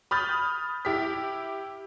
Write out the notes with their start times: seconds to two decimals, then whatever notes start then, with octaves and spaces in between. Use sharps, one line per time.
0.11 B5 D#6 F6 G6 A6
0.85 E4 G4 B6